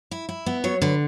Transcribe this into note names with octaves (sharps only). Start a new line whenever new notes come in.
E4
E4
B3
F#3 C#5
D3 B4